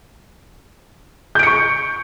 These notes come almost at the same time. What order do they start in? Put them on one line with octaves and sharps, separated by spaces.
G6 D7 C#7 C#6